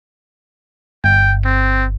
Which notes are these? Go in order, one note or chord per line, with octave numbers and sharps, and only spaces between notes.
G1 G5
C4